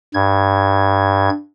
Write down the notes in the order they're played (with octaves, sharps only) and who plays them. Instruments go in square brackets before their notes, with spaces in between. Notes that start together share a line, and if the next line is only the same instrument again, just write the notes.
[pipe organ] G2 G#6